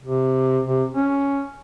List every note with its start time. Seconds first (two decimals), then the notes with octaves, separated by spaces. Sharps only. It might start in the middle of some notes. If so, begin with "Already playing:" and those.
0.02 C3
0.66 C3
0.94 C#4